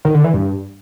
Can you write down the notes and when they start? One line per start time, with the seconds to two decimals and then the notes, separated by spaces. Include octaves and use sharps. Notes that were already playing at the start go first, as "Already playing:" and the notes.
0.05 D#3
0.14 D3
0.24 E3
0.34 G2